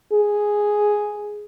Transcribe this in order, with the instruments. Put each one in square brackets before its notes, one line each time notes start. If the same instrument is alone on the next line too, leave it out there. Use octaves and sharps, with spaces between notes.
[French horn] G#4